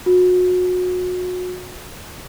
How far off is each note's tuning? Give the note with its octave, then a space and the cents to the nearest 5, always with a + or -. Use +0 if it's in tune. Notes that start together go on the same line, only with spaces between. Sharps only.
F#4 -30